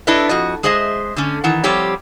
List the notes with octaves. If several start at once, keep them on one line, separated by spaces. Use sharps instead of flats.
D4 E4 A4 B4 D#5 E5
F2 F#4 D#5
G#3 G#4 C5 D#5 E5
D3 A3 C#4
D#3 E3 F#5
F3 G3 C4 G4 C#5